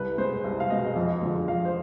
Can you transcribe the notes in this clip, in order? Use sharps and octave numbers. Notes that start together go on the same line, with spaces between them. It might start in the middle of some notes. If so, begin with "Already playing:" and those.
Already playing: C2 B4
B2 G#3 C5
C2
F5
B2 G#3 D#5
F2
D3 F3 G#3
F2 F5
C5